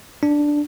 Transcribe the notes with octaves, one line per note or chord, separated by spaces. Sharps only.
D4